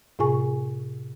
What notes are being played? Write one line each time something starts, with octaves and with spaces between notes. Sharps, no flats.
A2 C3 F4 G#4 G#5 C#6